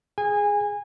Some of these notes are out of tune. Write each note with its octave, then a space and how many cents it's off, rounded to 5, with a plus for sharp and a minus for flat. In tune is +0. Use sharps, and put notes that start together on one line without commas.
G#4 +0 G#5 -25